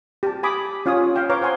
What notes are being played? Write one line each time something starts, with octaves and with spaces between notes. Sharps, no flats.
G4 A5
G#5 B5 D6 D#6
C#4 F4 C#5 G#5 D#6
F5 G5
B4 C#5 F5 A#5 C6 D6
C5 F#5 G#5 C6